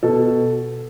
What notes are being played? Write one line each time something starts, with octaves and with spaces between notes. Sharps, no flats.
B2 A4